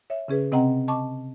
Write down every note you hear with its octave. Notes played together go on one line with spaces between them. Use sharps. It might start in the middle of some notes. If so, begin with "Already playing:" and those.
C#5 E5
C#3 C#4 G#4 B4
C3 C4 D#5 F#5 G5 A#5
D#5 A5 C#6 D6